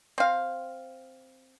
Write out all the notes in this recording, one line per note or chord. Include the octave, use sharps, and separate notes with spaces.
C4 F5